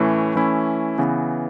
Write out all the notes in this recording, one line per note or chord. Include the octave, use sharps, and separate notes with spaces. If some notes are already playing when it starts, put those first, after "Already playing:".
Already playing: A2 E3 A3 C#4
E3 A3 C#4 E4
C#3 E3 B3